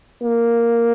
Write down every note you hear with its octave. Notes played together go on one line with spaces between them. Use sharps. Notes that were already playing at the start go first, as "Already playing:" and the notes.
A#3